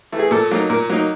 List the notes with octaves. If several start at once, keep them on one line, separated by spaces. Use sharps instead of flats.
E3 A3
G#4
A#2 A4
F#3 A#3 D#4
A#2 A#4
F#3 A#3 D#4